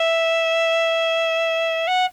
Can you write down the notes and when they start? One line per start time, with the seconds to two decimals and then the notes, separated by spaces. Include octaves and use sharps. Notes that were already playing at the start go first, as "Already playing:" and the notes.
Already playing: E5
1.87 F#5